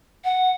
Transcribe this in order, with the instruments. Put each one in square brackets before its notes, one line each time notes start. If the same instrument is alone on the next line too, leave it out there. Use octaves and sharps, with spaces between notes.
[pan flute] F#5